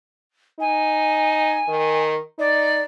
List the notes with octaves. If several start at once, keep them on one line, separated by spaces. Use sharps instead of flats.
D#4 G#5
D#3
D#4 D5